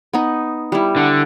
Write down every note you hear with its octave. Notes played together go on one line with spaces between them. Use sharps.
B3 D#4
G3 E4
D3